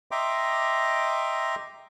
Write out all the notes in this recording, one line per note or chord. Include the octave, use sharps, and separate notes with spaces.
D#5 E5 G5 A#5 C6 D6